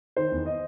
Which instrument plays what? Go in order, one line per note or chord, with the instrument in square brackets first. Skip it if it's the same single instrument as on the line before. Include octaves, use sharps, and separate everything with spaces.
[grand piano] D#3 C5
E2
D#5